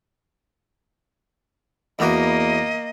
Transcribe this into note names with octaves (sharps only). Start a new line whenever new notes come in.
E2 A#3 B3 F#4 D#5